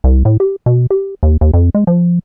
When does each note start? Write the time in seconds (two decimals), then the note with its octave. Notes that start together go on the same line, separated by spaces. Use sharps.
0.04 C2
0.25 A2
0.40 G4
0.66 B2
0.90 G4
1.23 D#2
1.41 D#2
1.54 F2
1.75 G#3
1.87 F3